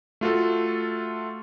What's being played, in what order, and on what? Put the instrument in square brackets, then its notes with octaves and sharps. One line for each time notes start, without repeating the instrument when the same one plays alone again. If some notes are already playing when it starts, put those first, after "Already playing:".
[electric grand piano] A3 F4 F#4 A4